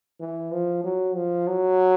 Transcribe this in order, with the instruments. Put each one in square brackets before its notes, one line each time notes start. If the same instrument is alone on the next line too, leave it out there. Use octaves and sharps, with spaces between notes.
[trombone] E3
F3
F#3
F3
F#3